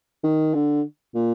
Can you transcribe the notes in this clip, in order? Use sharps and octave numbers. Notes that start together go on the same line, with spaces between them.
D#3
D3
A#2